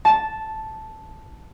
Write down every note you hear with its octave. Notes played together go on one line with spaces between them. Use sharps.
A5